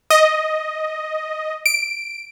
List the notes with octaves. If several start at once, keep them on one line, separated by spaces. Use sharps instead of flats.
D#5
D7